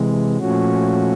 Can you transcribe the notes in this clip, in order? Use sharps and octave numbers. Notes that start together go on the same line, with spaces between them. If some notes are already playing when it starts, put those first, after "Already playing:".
Already playing: C3 E3 G#3
A#2 F3 A3 C#4 F#4